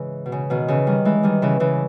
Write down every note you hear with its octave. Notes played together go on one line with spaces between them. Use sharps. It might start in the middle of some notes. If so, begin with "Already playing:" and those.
Already playing: G#2 C#3 E3
B2
C#3
B2 D#3
C#3 E3
D#3 G3
E3 G#3
D#3 G3
C#3 E3
C#3 E3